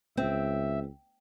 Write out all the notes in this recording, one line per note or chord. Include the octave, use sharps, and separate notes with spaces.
C#2 C4 E5